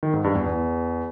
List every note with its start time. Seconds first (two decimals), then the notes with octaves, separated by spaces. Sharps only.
0.03 D#3
0.13 G#2
0.24 G2
0.35 E2
0.46 E2